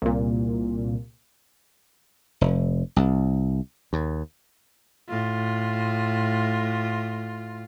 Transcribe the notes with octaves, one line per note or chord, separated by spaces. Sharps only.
C2 A#2
F1
C2
D#2
A2 F4